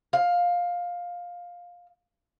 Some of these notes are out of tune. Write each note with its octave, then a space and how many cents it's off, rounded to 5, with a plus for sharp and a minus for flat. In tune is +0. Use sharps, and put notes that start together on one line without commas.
F5 +15